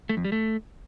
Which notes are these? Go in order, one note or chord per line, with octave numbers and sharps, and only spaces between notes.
A3
F2
G3
A3